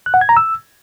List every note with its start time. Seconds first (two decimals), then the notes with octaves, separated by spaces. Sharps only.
0.06 F#6
0.14 F#5
0.21 G#6
0.29 A#5
0.37 E6